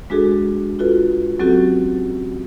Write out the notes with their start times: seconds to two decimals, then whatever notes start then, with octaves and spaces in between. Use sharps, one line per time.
0.10 G#3 D4 F#4 G#4 A4
0.79 F4 F#4 A4 B4
1.39 F#3 C4 C#4 F#4 G4 A4